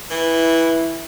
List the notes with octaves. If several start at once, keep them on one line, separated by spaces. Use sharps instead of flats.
E3 E4